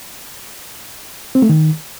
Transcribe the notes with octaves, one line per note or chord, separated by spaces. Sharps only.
C4
A3
D#3